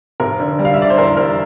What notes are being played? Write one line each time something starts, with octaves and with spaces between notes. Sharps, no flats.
F1 A#4
D3
G3
F5
E5
D3 D5
C5
E2 A#4
G3 A#4